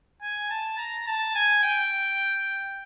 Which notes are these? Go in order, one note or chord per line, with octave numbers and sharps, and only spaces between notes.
G#5
A5
A#5
A5
G#5
G5